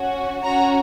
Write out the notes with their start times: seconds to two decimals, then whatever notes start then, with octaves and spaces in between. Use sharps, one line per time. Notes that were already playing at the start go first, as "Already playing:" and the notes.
Already playing: C#4 F#4
0.43 C#4 F#4 F#5 A#5